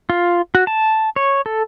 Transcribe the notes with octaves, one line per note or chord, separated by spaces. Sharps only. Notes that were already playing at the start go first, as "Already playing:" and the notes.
F4
F#4
A5
C#5
A4